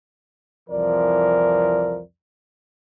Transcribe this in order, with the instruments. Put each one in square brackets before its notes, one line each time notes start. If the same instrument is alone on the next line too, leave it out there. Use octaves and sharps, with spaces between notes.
[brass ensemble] C2 F2 E3 F3 A#4 D5